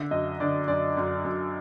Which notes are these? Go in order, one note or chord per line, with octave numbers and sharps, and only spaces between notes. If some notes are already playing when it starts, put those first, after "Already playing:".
Already playing: D3 E5
F#2 D#5
D3 D5
F#2 D5
F#2
F#2